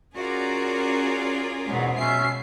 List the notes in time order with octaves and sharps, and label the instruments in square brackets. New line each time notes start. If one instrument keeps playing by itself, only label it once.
[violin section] C#4 A#4 D5 [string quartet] F4 G#4 [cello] F#4
[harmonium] E2 G#2 F#3 [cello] B2 G#3
[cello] B2 [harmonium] C#4 E5 [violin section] C7